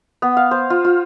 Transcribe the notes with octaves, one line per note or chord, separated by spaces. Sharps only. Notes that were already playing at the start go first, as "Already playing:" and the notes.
B3
F5
C5
F4
F4